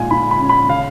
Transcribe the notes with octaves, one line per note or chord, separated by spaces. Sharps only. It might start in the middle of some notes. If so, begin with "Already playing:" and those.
Already playing: A#2 G#3 G#5
A#2 B5
B5
C#4
B5
C#3 F5